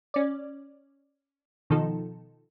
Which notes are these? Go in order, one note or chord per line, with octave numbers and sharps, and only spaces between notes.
C#4 D5
B2 D#3 F3 D#4 A4